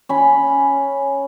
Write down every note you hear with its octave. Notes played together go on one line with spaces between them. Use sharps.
C#4 B5